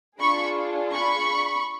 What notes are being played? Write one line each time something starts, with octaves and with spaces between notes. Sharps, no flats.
D4 F4 G#4 B5 C#6
B5 C#6